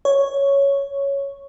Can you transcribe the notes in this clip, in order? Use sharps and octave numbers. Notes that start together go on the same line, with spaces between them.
C#5